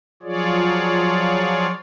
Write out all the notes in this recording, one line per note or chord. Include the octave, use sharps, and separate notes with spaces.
F3 F#3 F4 G#4 C#5 D5